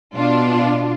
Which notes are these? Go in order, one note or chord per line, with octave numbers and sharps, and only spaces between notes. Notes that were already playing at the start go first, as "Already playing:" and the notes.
B2 D4 F4